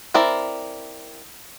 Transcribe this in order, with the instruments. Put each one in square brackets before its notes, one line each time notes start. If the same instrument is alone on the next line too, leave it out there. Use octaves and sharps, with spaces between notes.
[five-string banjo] C4 E4 A#4 D5